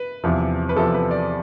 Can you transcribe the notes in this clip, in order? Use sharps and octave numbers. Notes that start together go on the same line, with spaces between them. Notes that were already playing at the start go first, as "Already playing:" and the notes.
Already playing: B4
E2 C3 F3
B4
E2 C3 F3 A4
B4
D5